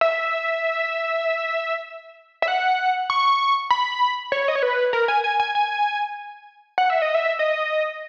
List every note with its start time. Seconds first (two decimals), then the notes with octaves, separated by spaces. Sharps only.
0.01 E5
2.42 E5
2.48 F#5
3.10 C#6
3.71 B5
4.32 C#5
4.48 D#5
4.55 C#5
4.63 B4
4.93 A#4
5.08 G#5
5.24 G#5
5.40 G#5
5.55 G#5
6.78 F#5
6.90 E5
7.02 D#5
7.15 E5
7.39 D#5